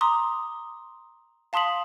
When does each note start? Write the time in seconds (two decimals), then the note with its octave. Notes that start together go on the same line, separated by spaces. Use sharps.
0.01 A#5 C6 D6 D#6
1.53 F5 A5 C6 D#6 B6 F#7